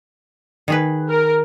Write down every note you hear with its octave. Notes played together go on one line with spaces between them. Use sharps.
D#3 G#4 B4
A#4